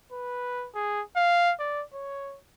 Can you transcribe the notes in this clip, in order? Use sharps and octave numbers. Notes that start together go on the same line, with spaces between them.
B4
G#4
F5
D5
C#5